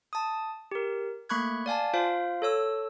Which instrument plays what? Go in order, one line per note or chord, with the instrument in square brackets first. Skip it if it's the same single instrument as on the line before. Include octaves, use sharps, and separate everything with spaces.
[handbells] A5 D#6
G4 A#4
A3 A#3 B5 C#6 F#6 G#6
D5 F5 G#5 A5
F4 C5 F5
A4 C#5 E6